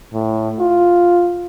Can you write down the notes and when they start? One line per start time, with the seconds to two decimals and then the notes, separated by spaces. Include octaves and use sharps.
0.13 A2
0.59 F4